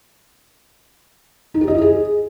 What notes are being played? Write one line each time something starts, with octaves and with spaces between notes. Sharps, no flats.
D#4
G4
D#5
E4
G#4